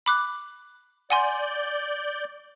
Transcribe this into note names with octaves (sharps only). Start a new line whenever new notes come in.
B5 D6 F#6
D5 F#5 G#5 C6 G6